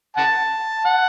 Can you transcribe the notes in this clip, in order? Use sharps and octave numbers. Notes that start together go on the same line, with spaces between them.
F#5 A5
F#5